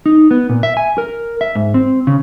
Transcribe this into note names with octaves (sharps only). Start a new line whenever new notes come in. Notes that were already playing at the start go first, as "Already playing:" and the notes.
D#4
B3
A#2
E5
G#5
A#4
E5
G#2
C4
C#3